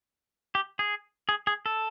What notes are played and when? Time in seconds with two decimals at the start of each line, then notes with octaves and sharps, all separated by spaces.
0.55 G4
0.79 G#4
1.29 G#4
1.47 G#4
1.66 A4